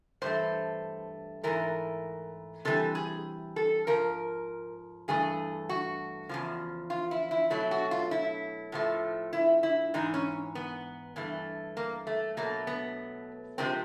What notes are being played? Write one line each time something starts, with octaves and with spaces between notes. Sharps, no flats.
G2 E3 A3 C5
G#2 E3 A3 A#4
C3 E3 G3 A4
G#4
A4
G#2 F3 A#4
G2 E3 A3 G#4
F#4
E2 C#3 F3
F4
E4
E4
B2 F#3 A3 E4
F#4
F4
E4
A2 F3 A3
E4
E4
G#2 E3 G#3 D#4
C#4
B3
G2 E3 A3
A#3
A3
B2 F#3 A3 A#3
B3
C3 F3 G#3 C4